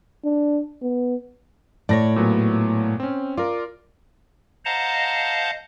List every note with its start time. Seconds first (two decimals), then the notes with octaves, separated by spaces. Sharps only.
0.25 D4
0.82 B3
1.89 A2 C#5 D5 A#6
2.16 A#2 F#3 B3
3.00 C4 C#4
3.37 F4 A#4 D5
4.65 C5 D#5 F5 F#5 A5 A#5